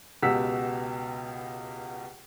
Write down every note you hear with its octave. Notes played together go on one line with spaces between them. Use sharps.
C#2 B2 G4 F#5 E6 B6